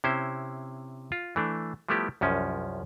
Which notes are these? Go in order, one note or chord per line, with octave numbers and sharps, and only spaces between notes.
C3 C#4 E4 C5
F4
E3 A3 D4
F3 G3 A3 B3 E4 G4
C2 F#2 F3 C#4